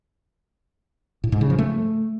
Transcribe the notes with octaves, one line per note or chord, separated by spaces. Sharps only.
A2
G#2
C#3
F3
A3